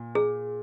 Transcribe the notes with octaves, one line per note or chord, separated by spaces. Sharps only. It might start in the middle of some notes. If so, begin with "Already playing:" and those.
Already playing: A#2
G#4